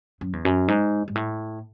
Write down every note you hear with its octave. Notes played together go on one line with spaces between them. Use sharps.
F#2
E2
F#2
G#2
G#2
A2